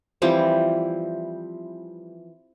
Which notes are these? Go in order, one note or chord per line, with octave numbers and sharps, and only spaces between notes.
E3 F3 G3 C4